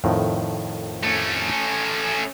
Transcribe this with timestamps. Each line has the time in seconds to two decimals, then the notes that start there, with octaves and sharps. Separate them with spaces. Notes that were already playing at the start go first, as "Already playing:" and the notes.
0.04 F2 A2 D#3
1.03 A3 C#4